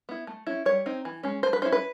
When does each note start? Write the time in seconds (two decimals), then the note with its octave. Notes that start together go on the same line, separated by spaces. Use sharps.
0.09 B3 E4
0.27 A3
0.47 C#4 E4
0.66 G3 C#5
0.86 C4 D#4
1.05 E3
1.23 G#3 C#4
1.43 A3 C5
1.53 B4
1.62 C#4 E4 C5
1.72 B4